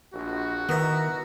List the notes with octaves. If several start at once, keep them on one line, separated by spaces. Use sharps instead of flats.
A#1 F#4
D#3 B3 E4 A#4 E5